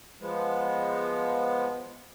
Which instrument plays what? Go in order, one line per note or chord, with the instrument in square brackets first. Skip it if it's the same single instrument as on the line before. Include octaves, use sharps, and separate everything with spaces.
[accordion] F3 G#3 B3